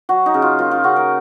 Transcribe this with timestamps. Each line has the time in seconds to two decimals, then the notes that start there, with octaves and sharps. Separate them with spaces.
0.09 F#3 F#4
0.26 D#4
0.34 C#3
0.42 F4
0.59 A#3 F4
0.71 F4
0.84 C#3 F#4
0.96 A#4